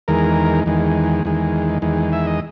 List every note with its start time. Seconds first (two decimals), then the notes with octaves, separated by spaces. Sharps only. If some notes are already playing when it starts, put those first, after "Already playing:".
0.08 E2 D#3 G#3 A#4
0.66 E2 D#3 G#3
1.25 E2 D#3 G#3
1.82 E2 D#3 G#3
2.13 E5
2.27 D#5